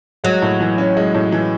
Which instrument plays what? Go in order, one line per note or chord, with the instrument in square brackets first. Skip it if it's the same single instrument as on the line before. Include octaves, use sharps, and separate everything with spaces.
[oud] F#3 [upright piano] G#3
[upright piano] A2
E3
C#4
G#3
A2
E3